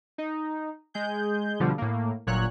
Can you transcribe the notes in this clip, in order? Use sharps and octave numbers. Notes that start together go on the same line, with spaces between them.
D#4
G#3 G#4 G6
B2 D3 F3 G3
A2 A#3
G1 A#2 F#3 C#5 F#6